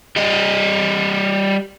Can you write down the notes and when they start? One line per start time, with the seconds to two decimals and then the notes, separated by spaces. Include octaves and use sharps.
0.16 G3 D#5